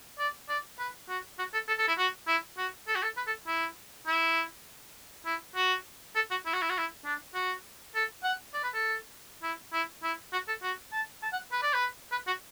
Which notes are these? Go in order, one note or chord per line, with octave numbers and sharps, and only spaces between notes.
D5
D5
B4
F#4
F#4
A4
A4
A4
E4
F#4
E4
F#4
A4
F#4
A4
B4
A4
E4
E4
E4
F#4
A4
F#4
E4
F#4
E4
F#4
E4
D4
F#4
A4
F#5
D5
B4
A4
E4
E4
E4
F#4
A4
F#4
A5
A5
F#5
B4
D5
B4
B4
F#4